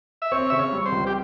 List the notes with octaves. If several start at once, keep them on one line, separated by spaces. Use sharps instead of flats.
E5
C4 C#5
C#3 E5
C#5
G3
C5
C#2
G4